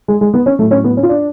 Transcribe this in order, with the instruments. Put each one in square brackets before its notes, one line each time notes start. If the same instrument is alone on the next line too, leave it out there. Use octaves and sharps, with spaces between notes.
[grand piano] G#3
G#3
B3
C#4
A2 F#3 A3
C#4
B3
C#4
F4
D4